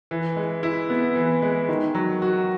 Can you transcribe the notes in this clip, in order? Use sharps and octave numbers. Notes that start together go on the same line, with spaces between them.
E3
G#3
E4
B3
E3
G#3
D#3
F#3
F#4